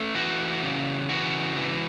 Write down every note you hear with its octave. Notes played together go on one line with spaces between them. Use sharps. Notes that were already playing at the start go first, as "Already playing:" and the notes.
Already playing: A3 C#4
E3 F#4
C#3
E3 F#4
E3